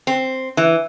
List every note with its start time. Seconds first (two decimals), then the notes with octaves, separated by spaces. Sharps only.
0.07 C4
0.57 E3